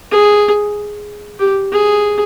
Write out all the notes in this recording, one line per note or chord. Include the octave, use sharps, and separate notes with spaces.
G#4
G4
G#4